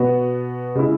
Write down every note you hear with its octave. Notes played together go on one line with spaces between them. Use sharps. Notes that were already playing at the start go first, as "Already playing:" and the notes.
Already playing: B2 B3 F#4
C#3 G#3 E4